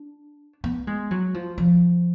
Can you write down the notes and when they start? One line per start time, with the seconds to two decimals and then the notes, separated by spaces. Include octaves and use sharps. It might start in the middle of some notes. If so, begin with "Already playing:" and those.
Already playing: D4
0.64 B3
0.87 G#3
1.11 F#3
1.34 F3
1.58 F3